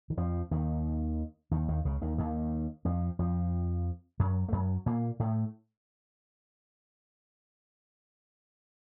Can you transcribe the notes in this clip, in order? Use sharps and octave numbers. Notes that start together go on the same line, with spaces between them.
D#3
F2 F3
D#2 D#3
D#2 D#3
D#2 D#3
C#2 C#3
D#2 D#3
D#2 D#3
F2 F3
F2 F3
F#2 F#3
A3
F#2 F#3
A#2 A#3
A2 A3